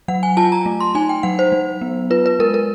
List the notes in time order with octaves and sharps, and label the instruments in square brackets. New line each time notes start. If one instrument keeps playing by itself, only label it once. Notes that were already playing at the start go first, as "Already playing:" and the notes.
[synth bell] F#3 F#5
G#5
F4 A5
A#5
A3
C6
D#4 G#5
G5
F#3 F#5
C5
F#3
B3
F4 B4
B4
G#3 A#4
A#4